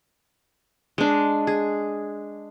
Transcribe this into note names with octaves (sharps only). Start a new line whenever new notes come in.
G#3 D4
G#4